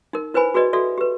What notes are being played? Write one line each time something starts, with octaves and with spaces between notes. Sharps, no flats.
D#4 A#4
E4 B4 C5 G#5 B5
F#4 G#4 B4 D5 D#5
F#4 A4 D5 E5
G4 B4